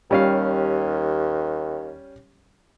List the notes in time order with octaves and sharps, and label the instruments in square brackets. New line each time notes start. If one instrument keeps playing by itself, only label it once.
[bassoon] D#2 [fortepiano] G3 C#4 F5